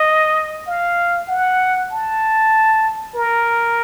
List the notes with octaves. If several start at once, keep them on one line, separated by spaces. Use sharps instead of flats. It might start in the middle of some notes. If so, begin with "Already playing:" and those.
Already playing: D#5
F5
F#5
A5
A#4